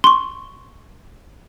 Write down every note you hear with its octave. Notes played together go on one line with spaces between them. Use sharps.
C6 C#6